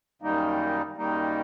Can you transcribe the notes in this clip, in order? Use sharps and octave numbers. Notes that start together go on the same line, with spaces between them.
F#2 D#3 G3 A#3 D#4
F#2 D#3 G3 A#3 D#4